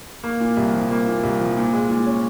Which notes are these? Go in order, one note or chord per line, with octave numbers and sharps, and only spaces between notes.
A#3
A#2
C2
F3
A#3
A#2
C2
F3
A#2
G#3
A#2
C#4